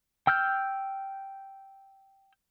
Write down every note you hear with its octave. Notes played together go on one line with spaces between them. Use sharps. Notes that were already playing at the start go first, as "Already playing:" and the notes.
G5 E6 F6 G6